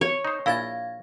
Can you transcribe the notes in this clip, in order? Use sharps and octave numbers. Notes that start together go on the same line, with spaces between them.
C#5
D#4 C5
A#1 E4 F5 G#6 A6